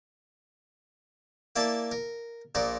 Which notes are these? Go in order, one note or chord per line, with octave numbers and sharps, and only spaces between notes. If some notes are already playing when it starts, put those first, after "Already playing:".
A#3 E4 D5 A5
A#4
A#1 A#2 A#4 D5